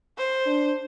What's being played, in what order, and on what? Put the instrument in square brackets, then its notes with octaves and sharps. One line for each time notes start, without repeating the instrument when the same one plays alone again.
[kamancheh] C5
[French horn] D4